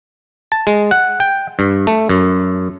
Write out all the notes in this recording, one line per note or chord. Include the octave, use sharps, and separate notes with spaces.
A5
G#3
F#5
G5
G2
A3
F#2